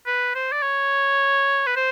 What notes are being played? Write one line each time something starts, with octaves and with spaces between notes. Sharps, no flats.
B4
C5
D5
C#5
B4
C5